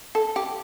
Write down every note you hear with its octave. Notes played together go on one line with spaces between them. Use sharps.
A4
G4